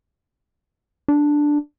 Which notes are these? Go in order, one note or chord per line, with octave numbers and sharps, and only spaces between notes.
D4